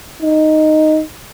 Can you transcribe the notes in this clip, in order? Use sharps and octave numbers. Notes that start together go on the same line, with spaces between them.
D#4